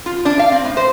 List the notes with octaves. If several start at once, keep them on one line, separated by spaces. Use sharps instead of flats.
F4
D4
F5
C4
A2
C5